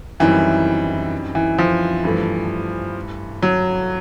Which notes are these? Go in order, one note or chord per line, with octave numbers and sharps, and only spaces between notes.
F#2 D#3 E3 G3 C4 E4
E3
F3
G2 E3 A3
F#3